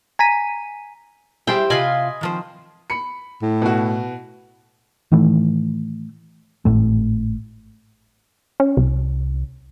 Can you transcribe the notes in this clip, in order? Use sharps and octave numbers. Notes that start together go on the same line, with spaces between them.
G#5 A#5 B6 D#7
G3 E4 G4 G#4 C5 G5
C3 F4 D#5 F5 G#5 B5
D#3 F3 C4
B5 C#7
A2
B2 F#4
A2 D#3 E3 A3
G#1 F2 A2 A3
C#4
C2